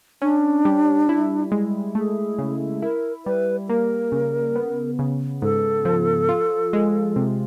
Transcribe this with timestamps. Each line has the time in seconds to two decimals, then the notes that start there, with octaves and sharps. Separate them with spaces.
0.22 C#4 D4
0.65 G3
1.09 E4
1.52 G#3
1.95 A3 G#4
2.38 C#3
2.82 E4 A#4
3.26 G3 B4
3.69 A#3 A#4
4.12 C#3
4.56 B3
4.99 C#3
5.42 G#2 A4
5.85 F3
6.29 F4
6.73 G#3
7.16 C3